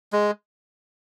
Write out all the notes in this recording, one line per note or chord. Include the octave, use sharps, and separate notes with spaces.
G#3